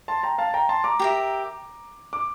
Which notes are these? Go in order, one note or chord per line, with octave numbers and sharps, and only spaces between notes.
A5 C6
G5 A#5
F5 A5
G5 A#5
A5 C6
A#5 D6
G4 A#4 E5
D6